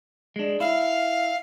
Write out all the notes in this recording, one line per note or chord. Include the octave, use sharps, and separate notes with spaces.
G#3 D4
E4 F5